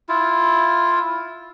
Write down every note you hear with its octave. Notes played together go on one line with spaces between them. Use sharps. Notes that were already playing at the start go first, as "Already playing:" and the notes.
E4 F4